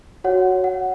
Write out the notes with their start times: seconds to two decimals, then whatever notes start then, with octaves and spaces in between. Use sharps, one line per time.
0.24 F#4 C#5 F#5
0.64 F#5